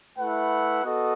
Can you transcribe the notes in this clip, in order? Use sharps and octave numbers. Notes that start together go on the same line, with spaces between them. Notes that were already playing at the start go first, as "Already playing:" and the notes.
A3 E4 B4 F#5
B3 F#4 A4 D#5